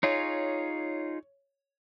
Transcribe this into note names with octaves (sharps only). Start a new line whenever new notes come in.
D#4 F4 G#4 C#5